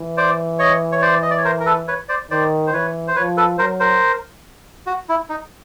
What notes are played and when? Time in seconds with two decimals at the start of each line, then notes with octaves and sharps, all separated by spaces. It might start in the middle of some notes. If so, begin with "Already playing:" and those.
Already playing: E3
0.17 C5 D5
0.59 C#5 D#5
0.92 C#5
1.02 C5 D5
1.22 D#5
1.30 D5
1.38 C#5
1.45 A#4 C5
1.60 A#4
1.66 A4 B4
1.88 B4 C#5
2.09 C5 D5
2.31 D#3 C5 D5
2.67 C5
2.73 E3 B4 C#5
3.08 C5
3.15 F3 B4 C#5
3.37 A4 B4
3.58 F#3 A#4 C5
3.80 A#4 C5
4.86 F#4
5.09 E4
5.29 D#4